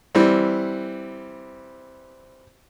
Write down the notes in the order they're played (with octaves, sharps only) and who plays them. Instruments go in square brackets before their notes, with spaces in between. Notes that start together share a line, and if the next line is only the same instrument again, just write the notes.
[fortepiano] E3 G3 C4